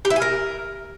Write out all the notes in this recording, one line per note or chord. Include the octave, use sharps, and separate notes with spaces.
G4
E4
G#5
A#4